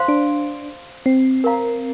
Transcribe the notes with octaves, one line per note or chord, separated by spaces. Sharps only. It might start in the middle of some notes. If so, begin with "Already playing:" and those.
Already playing: C5 F5 C6
D4
C4
A#4 F5 A#5